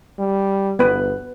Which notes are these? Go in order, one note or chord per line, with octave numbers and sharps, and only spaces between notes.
G3
G1 B3 B4